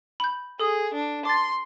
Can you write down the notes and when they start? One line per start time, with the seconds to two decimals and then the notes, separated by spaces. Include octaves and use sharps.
0.20 B5 G6
0.59 G#4 A4 D#6
0.94 D4
1.25 C6 D6 A6